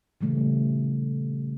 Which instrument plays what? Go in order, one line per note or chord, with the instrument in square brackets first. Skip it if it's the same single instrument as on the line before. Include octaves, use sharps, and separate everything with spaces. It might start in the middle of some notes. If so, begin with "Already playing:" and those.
[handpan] A#2 C#3 E3 G3 A3